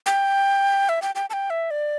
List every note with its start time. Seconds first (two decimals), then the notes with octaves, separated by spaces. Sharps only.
0.06 G5
0.89 E5
1.02 G5
1.15 G5
1.30 A5
1.33 G5
1.50 E5
1.71 D5